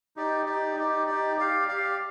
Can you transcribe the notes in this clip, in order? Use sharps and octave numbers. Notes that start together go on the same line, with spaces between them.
D#4 G4 D5
D#4 G4 D5
D#4 G4 D5
D#4 G4 D5
G4 D5 F5
G4 D5 F5